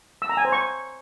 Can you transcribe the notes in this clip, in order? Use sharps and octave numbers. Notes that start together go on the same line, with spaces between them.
E6
A#5
G#5
C5
C#6